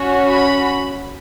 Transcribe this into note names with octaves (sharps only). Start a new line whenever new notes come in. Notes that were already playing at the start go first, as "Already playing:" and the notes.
Already playing: C#4 F#4
B5